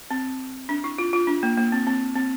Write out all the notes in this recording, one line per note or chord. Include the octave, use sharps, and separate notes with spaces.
C4
D4
E4
F4
F4
D4
A#3
A#3
C4
C4
C4